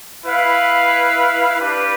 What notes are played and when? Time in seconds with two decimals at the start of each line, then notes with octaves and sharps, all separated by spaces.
0.25 E4 B4 F5
1.59 D4 G4 B4